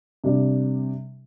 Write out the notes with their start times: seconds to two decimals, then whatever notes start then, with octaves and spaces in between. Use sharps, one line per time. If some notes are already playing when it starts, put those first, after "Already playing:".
0.24 C3 G3 D4